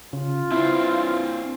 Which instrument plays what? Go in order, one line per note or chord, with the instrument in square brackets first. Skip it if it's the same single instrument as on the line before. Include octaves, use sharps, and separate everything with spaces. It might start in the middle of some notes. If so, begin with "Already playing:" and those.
[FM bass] C#3 [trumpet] F4
[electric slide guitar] C4 D4 C5 [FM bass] E4